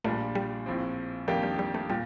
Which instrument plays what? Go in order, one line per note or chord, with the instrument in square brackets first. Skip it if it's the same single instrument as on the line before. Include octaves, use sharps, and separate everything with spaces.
[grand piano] A#1 A#2 G3 D4 F4 [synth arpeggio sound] A3
[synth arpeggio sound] G3
[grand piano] A#1 A2 F3 C4
[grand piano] F2 D#3 A#3 D4 G4 [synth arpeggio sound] A3
[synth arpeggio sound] G3
G3
A3
[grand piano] A#2 [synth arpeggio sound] G3